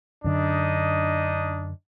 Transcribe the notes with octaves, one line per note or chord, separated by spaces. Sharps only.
F#2 D3 D4 D#4 D#5